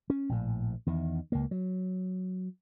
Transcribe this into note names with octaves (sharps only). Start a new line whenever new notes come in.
C#4
A#1 A2
E2 D#3
C#2 A#3
F#3